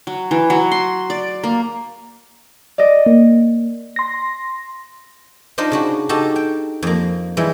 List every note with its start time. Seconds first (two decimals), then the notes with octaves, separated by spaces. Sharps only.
0.07 F#3
0.31 E3
0.50 F#3
0.71 C6
1.10 D5
1.43 A#3
2.78 D5 D#5
3.06 A#3
3.96 C6 A#6
5.58 D4 D#4 F4 C5 D#5
5.72 C#3 D4 F#4
6.09 D#4 F#4 G4 A4 A5
6.36 G5
6.82 F2 A#3
7.37 E3 G3 G#3 E4